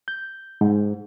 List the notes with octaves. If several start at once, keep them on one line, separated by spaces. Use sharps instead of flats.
G6
G#2